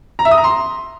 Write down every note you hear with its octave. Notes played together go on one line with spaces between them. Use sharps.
A#5
E5
D#6
A#5
C6